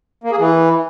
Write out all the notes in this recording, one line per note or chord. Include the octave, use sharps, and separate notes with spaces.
A#3
G#4
E3